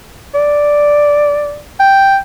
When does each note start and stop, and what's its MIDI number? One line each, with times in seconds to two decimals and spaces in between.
0.35 1.60 74
1.80 2.18 79